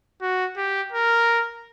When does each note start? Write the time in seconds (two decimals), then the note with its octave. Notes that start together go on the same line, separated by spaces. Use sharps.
0.22 F#4
0.57 G4
0.92 A#4